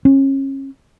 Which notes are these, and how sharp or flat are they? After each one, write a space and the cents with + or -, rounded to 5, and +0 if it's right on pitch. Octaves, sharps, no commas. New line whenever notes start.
C#4 -30